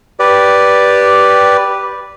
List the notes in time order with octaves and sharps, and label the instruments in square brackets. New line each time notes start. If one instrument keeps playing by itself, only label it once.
[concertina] G4 B4 D5